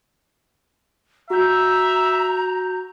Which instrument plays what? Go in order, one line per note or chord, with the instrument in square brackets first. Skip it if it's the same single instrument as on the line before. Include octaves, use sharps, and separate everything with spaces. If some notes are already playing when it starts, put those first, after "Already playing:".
[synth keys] F#4 G6 [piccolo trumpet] E5 [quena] A#5